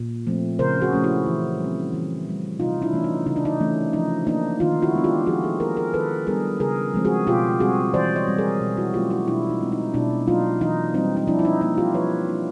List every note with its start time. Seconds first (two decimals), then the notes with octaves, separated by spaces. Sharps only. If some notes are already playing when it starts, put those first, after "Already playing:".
Already playing: A#2
0.27 F3 A3 C4
0.59 C#3 A#4 C5
0.82 F#4 G#4
0.93 F3 A3 C#4
1.04 E4 F#4
1.26 E3
1.59 G3
1.65 C4
1.93 E3
2.27 G3 C4
2.60 C3 D#4 F4
2.82 D4 E4
2.93 E3 A3 C#4
3.04 D#4
3.26 C#3 D#4
3.36 D4
3.45 D#4
3.60 E3 A3 C#4
3.93 F3 D#4
4.27 A#3 D4 D#4
4.60 D#3 D#4 F4
4.82 E4 F#4
4.93 G#3 B3 D4
5.04 F4 G4
5.27 F3 F#4 G#4
5.43 G4 A4
5.60 A#3 D4 G#4 A#4
5.77 G#4 A#4
5.94 D#3 A4 B4
6.27 G3 B3 D4 G#4 A#4
6.60 C#3 G#4 A#4
6.94 F3 G#3 C4
7.05 F#4 G#4
7.27 B2 F4 G4
7.60 G3 C4 F#4 G#4
7.94 E3 C5 D5
8.16 C#5 D#5
8.27 G3 C4
8.38 G#4 A#4
8.61 B2
8.77 E4 F#4
8.94 F#3 A3 C#4 F4 G4
9.10 E4 F#4
9.27 B2 D4 E4
9.50 D#4
9.61 G#3 C4
9.72 D#4
9.94 B2 D4 E4
10.27 F#3 A#3 D4 D#4 F4
10.61 E3 D#4
10.94 G3 C4 D#4
11.17 D#4
11.27 F3 D4 E4
11.39 E4
11.45 D#4
11.61 A#3 D4 D#4
11.78 F4 G4
11.94 F3 B4 C#5
12.28 A#3 D4